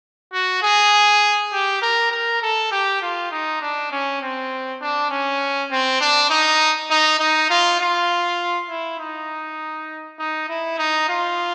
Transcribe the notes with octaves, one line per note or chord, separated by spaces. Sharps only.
F#4
G#4
G4
A#4
A#4
A4
G4
F4
D#4
D4
C#4
C4
D4
C#4
C4
D4
D#4
D#4
D#4
F4
F4
E4
D#4
D#4
E4
D#4
F4